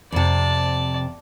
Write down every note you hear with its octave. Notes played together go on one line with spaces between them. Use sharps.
F2 C3 D5 A5